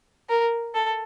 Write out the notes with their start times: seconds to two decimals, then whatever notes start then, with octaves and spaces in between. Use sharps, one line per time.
0.29 A#4
0.75 A4